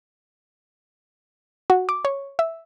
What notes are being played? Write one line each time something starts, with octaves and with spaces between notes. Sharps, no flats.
F#4
D6
C#5
E5